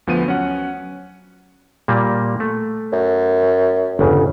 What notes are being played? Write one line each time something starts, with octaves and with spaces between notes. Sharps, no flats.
D2 F3 B3 D#7
F#3 C#4 F#5
A#2 G3 A#3
A3
F#2
G1 E2 C#3